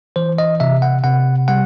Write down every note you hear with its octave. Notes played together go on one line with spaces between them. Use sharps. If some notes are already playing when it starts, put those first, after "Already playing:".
E3 C5
D#5
C3 E5
F#5
C3 F#5
G3 F#5